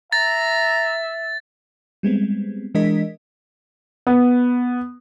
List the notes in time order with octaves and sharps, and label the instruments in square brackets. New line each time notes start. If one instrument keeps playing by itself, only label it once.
[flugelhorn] E5 [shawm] A#5 [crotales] A6
[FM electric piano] G3 G#3 B3 C4
E3 G#3 D4 A#4 D#5 B6
[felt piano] B3